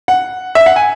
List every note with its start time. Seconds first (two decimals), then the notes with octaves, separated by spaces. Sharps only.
0.08 F#5
0.55 E5
0.66 F#5
0.76 G#5